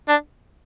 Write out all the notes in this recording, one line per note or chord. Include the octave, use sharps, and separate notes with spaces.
D4